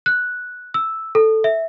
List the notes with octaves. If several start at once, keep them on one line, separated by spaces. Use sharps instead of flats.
F#6
E6
A4
E5